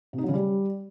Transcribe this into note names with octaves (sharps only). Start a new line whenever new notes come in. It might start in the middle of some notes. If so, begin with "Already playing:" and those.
C3
D#4
F#3
C#3
G3